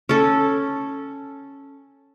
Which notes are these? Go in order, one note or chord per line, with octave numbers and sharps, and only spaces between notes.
C#4 A4